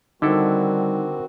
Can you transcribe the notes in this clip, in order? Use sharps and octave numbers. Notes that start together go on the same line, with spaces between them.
D3 D#3 G3 C4 D#4 E4 F#4 A4